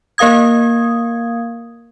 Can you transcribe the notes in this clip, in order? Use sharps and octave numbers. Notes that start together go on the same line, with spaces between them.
A#3 A#4 F5 D#6 G#6